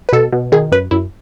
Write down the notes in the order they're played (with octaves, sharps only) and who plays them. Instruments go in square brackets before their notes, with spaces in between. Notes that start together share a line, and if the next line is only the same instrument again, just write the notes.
[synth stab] B4
B2 A4
B2
D#3 G#4
F#2 B4
F#2 E4